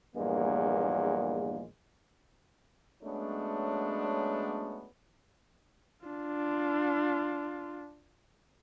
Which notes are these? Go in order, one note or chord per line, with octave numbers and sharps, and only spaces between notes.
A#1 E2 G2 G#3 A#3
F#3 G#3 A3 B3 C#4 D4
D4 F4